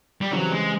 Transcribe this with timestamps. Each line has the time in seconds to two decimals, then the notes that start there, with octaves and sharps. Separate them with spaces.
0.21 G3
0.32 C#3 E3 F#3 G3 C4
0.51 G#3